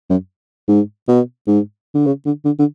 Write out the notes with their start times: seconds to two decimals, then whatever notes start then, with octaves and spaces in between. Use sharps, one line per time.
0.10 F#2
0.68 G#2
1.08 B2
1.47 G#2
1.94 D3
2.06 C#3
2.25 D3
2.45 D3
2.59 D3